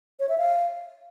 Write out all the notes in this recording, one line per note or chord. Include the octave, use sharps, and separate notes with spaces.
C#5
E5
F5